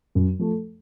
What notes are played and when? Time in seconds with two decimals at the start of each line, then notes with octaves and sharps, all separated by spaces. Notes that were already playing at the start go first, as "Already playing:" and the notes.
0.15 F#2
0.39 F3 A3